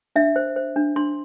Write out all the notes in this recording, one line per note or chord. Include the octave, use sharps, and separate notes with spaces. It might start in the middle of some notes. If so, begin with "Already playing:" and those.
D4 E5
C5
C5
D4
D4 C6